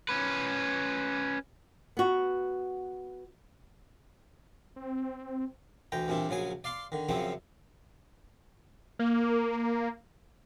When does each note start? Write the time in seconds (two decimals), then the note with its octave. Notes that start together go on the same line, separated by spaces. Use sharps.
0.09 C#4 B4
1.97 B3 F#4
4.76 C4
5.92 D2 E3 G5 A#5
6.08 G2 A#2 E3 C4 D4
6.29 A#1 C#3 F#3 G#4 G#5
6.64 D5 F5 C6 D6
6.92 D3 D#3
7.09 F#2 C#3 F3 F#3 C4 E4
8.99 A#3